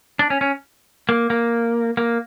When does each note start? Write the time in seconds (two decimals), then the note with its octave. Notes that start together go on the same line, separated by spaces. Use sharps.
0.19 D4
0.30 C#4
0.41 C#4
1.09 A#3
1.30 A#3
1.97 A#3